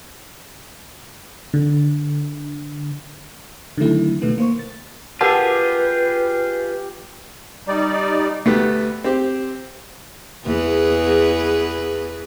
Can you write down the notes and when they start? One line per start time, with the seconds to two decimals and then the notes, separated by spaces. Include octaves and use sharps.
1.54 D3
3.78 D3 D#3 F#3 A3 E4
4.22 B2 D#3 A3 B3
4.38 A#3 C5 C#6
4.59 A6
5.21 F4 G4 G#4 A#4 B4 F#5 A5
7.68 G3 D#4 D5
8.45 D2 A3 B3 G4
9.04 C4 G4
10.45 E2 G#4 B4